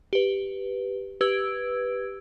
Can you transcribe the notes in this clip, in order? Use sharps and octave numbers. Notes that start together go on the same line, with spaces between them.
G4 B4
G4 B4 E6 G#6 D7